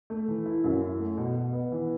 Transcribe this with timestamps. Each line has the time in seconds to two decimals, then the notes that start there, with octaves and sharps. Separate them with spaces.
0.10 A3
0.28 E3
0.46 E4
0.64 F#2
0.82 E4
0.99 A3
1.17 B2
1.35 B2
1.53 B3
1.72 E3